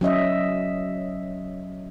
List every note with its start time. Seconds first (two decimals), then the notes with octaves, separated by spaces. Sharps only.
0.01 F#3 C#4 D#5 E5